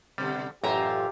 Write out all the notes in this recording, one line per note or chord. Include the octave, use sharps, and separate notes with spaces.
B2 D3 G3
A1 F#2 A#2 E4 F4 G4 E5 A#5